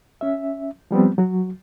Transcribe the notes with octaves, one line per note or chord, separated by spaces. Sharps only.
C#4 E5
F3 G3 B3 C4
F#3 F#4